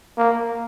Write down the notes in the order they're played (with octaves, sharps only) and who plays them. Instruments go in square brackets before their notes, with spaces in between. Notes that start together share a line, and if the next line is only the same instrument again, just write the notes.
[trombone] A#3